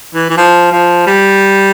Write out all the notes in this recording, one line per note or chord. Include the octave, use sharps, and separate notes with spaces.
E3
E3
F3
F3
G3